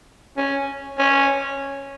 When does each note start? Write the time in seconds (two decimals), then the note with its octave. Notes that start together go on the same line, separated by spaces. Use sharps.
0.37 C#4
0.99 C#4